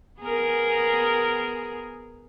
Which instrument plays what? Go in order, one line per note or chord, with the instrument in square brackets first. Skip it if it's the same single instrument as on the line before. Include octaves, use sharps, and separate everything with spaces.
[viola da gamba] B3 G#4 A#4